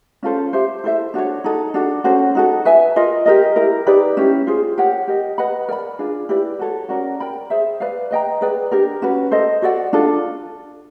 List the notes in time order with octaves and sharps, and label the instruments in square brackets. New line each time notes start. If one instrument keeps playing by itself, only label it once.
[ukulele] C#4 F4 A4 C5
G4 C5 E5
E4 A4 C5 E5
D4 F#4 A4 C#5
D#4 F#4 A4
D4 F#4 A4
C#4 F#4 A4 C5
D#4 F#4 A4
B4 E5 G#5
F4 A#4 D#5
G4 A#4 D#5
E4 G4 A#4
D#4 G4 B4 D5
C#4 E4 G4
F4 G#4 C5
G4 A#4 C#5 F#5
G4 A#4 D#5
B4 D#5 F#5 B5
A#4 D5 G5 B5
D4 F4 G#4
E4 G4 B4 D5
F#4 A4 C#5
C#4 F#4 A#4 D5
A#4 D5 G5 B5
G#4 C5 E5
B4 D5 F5
B4 D#5 G5 A#5
G#4 B4 D5 G5
D4 G4 A#4
C#4 F#4 B4
A4 C5 D#5
F#4 A4 D5 F#5
D4 F4 A4